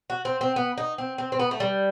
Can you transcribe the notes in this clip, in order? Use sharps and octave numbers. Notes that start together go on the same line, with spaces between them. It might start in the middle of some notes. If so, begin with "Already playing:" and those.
F#4
C4
C4
B3
D#4
C4
C4
C4
B3
A3
G3